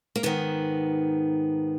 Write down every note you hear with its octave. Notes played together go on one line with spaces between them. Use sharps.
A#3
G#2 D#3 B3